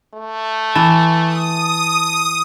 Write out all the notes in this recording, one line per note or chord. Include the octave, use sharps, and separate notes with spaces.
A3
E3 A5
D#6